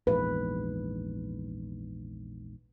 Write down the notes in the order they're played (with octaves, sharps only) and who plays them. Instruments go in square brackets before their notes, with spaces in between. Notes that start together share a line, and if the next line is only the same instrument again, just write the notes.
[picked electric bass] A#1 E2 G#2 [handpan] B4